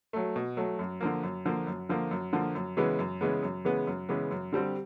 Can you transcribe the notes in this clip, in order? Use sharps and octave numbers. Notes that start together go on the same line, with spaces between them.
F#3 A3
B2
F#3 A3
F#2
D3 F3 A#3
F#2
D3 F3 A#3
F#2
D3 F3 A#3
F#2
D3 F3 A#3
F#2
C#3 E3 G#3 B3
F#2
C#3 E3 G#3 B3
F#2
C#3 E3 G#3 B3
F#2
C#3 E3 G#3 B3
F#2
D3 G3 C4